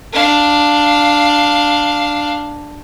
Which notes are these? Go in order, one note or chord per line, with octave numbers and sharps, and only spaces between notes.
D4 F5